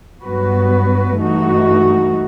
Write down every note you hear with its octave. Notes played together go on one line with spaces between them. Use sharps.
G2 F#3 B3 F#4 B4
G2 E3 A3 D#4 F#4